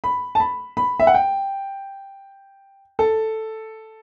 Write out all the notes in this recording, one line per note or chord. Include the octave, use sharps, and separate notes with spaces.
B5
A5
B5
B5
E5
F#5
G5
A4